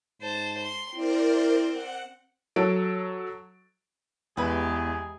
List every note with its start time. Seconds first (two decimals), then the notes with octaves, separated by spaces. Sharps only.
0.22 G#2 C5 A5
0.62 C6
0.96 C4 E4 A#4 C5 D5
1.72 F#5
2.56 F#3 A4 D7
4.37 E2 G#3 E4 G4 G#4 B4